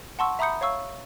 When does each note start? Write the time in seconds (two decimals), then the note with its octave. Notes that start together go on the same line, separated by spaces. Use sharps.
0.19 F#5 A5 C6 C#6 E6
0.39 E5 A#5 B5 D#6 G6 C#7
0.61 C#5 F5 C#6 E6